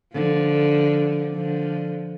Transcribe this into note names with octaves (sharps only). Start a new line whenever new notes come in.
D3 F3
D3 F3